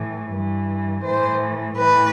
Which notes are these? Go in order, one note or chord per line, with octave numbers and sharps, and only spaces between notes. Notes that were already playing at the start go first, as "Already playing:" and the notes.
Already playing: A2 E3
G2 E3
A2 E3 C5
A2 E3 B4